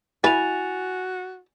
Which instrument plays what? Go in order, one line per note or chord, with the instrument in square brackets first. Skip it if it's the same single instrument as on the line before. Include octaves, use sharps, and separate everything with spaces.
[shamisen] E4 B4 [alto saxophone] F#4 [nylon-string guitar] G#5 [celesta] A6 F7